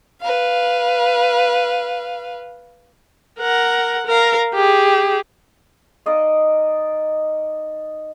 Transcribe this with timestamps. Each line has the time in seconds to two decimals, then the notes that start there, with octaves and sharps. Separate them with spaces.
0.23 B4 F5
3.39 A#4 F#5
4.07 A#4 F5
4.54 G4 G#4
6.06 D#4 D5 D#5 F5